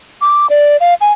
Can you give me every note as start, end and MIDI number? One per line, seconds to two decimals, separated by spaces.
0.21 0.47 86
0.50 0.77 74
0.81 0.94 77
1.01 1.12 80